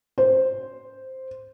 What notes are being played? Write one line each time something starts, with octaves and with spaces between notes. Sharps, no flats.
C5